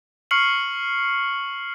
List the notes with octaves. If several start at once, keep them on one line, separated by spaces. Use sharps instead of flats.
C#6 F6 C7 C#7 F#7